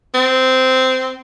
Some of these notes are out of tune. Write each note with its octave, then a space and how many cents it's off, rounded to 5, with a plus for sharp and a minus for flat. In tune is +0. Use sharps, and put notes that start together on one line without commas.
C4 -15